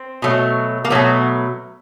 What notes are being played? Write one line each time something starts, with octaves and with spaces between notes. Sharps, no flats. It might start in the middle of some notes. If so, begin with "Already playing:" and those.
Already playing: C4
B2 F#3 A3
A#3
B2 F#3 A3 B3